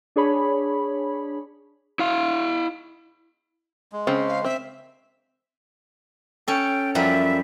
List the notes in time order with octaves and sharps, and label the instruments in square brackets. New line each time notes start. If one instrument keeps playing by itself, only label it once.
[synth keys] D4 G#4 C#5 B5
[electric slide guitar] E4 F5
[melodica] G#3
[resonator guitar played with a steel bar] C#3 [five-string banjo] C4
[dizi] F5
[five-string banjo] C4 [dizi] E5
[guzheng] C#4 A4 [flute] G5
[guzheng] F#2 F3 G3 [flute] E5